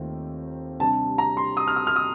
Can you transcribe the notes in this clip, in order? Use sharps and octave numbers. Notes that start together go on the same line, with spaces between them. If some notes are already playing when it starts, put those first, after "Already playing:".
Already playing: D#2 D#3 A3 C4 F4
C3 G3 D4 A5
A#5
C6
D#6
F6
D#6
F6
D#6